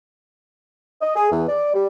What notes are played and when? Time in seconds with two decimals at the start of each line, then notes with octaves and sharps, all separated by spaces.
1.02 D#5
1.16 G#4
1.31 E2
1.48 D5
1.74 G3